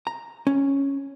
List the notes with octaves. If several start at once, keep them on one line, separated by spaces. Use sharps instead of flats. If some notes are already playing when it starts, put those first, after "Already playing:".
A#5
C#4